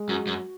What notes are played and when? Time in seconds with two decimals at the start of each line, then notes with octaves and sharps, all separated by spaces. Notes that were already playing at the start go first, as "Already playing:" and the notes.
Already playing: G#3
0.09 F#2 F#4
0.27 F#2